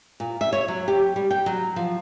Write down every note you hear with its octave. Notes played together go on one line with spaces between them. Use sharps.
A#2
E5
C#5
F#3
G4
G3
G5
F#3
F3